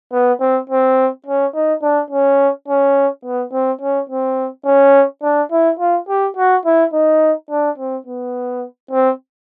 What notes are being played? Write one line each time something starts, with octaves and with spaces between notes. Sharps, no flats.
B3
C4
C4
C#4
D#4
D4
C#4
C#4
B3
C4
C#4
C4
C#4
D4
E4
F4
G4
F#4
E4
D#4
D4
C4
B3
C4